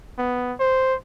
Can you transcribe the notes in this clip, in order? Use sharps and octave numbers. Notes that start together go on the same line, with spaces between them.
B3
C5